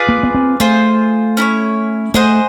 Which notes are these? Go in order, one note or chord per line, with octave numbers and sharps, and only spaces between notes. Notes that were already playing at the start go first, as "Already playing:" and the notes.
Already playing: F4 G#4 B4 D5
A#3
B3
C4
A3 F4 G#4 C5
C#4 E4 A4 C#5
A3 G#4 C5 D#5 F#5